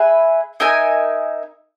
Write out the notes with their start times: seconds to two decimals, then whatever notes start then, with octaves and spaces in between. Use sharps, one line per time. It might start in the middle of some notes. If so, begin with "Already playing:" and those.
Already playing: G#4 B4 E5
0.60 D#4 A#4 E5 G#5